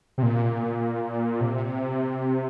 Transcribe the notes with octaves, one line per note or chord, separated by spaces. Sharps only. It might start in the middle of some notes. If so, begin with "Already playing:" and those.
C3
A#2
C3